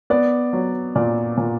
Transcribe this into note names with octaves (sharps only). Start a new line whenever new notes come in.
B3 D5
F#3
A#2 D5
A#2